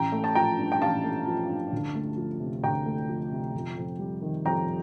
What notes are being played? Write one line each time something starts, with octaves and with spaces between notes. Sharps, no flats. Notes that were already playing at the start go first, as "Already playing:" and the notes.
Already playing: A1 G5 A#5
A3
A5
F3 G5 A#5
G2
G5
A1 F5 A5
A3
F3
G2
D2
A3
F3
C3
D2 G5 A#5
A3
F3
C3
F2
F2
G3
D#3
F2 G5 A#5